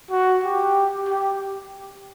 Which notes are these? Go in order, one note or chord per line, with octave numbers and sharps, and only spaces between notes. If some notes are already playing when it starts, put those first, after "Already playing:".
F#4
G4
G4